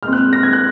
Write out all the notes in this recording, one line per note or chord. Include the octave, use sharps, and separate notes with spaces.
A#2 G#3 C4 F6
F#6
A#6
G#6
F#6